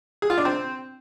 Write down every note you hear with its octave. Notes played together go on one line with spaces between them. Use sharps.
G#4
F4
D4
C4